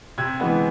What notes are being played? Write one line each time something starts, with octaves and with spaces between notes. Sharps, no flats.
C3 G#6
E3 G#3 B3